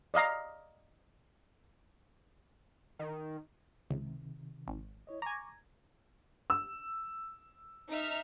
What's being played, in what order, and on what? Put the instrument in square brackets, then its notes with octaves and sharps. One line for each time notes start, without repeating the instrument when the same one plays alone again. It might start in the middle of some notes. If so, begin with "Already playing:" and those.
[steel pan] D5 D#5 F5 A#5
[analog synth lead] D#3
[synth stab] C#2 [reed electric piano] C3 D#3
[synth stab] G#1
[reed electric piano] E4 C#5 D#5
[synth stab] G#5 A#5 [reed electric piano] C#6 D6
[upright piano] E6
[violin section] D#4 E5 F6